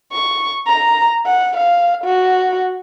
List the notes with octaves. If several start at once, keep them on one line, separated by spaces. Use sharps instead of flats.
C#6
A#5
F#5
F5
F#4